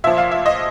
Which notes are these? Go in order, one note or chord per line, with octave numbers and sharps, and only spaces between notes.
A#2 F3 E5
F5
E5
D#5